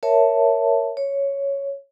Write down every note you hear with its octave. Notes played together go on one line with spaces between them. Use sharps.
A#4 C#5 E5 A5
C#5